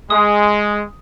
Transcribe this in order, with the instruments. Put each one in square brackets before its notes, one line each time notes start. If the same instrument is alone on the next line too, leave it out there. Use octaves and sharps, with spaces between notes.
[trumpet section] G#3 [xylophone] D#6